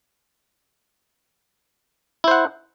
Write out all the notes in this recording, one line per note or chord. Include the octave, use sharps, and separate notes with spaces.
E4 C5 F#5